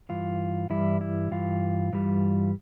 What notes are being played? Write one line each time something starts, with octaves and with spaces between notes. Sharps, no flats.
G2 E3 F4
G2 E3 G3 E4
E4
G2 E3 F4
G2 E3 G3